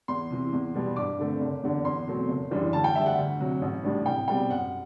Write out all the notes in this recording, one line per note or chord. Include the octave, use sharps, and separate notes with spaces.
E2 C6
C3 E3
E2
B2 G3 B3
G2 D6
D3 A3 C4
F#1
E2 D3
E2 C6
B2 F#3 A3 C4
F#1
F#2 E3 G3 D4
D2 A5
G5
D3 G3 E5
F#5
D2
C3 F#3
A1
A2 G3 D4
C2 G5
B2 G3 C4 G5
F#2 F#5